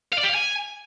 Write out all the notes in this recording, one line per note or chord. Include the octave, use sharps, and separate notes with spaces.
F5
D5
G4
F5
G#5